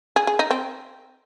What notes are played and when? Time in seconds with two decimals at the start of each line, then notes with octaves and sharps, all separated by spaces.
0.16 G#4
0.27 G#4
0.39 D#4
0.51 C4